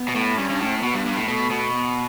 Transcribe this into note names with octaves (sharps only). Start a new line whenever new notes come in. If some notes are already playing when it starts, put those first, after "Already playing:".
Already playing: B3
B2
A2
G2 C#4
G2
A2
B2 B3
G2
G2
A2
B2 A3
B2
B3